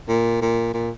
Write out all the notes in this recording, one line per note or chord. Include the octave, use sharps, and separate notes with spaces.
A#2
A#2
A#2